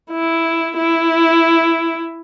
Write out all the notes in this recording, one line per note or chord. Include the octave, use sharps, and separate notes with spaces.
E4
E4